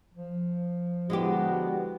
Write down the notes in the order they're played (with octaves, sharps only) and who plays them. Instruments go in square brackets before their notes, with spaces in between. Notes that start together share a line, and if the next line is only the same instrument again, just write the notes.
[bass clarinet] F3
[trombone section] D3 B3 F#4 [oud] G#3 E4 G4